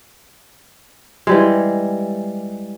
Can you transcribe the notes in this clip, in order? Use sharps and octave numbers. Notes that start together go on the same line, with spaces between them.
E3 G3 G#3